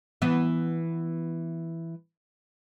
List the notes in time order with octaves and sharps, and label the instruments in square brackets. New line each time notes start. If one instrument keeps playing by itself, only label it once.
[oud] E3 B3